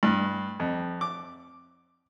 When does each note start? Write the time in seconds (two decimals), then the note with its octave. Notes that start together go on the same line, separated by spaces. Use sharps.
0.03 G2
0.60 F2
1.01 D6